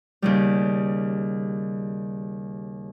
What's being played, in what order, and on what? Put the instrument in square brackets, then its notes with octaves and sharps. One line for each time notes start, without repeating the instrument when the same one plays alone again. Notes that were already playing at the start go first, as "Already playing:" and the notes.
[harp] D#2 C#3 G3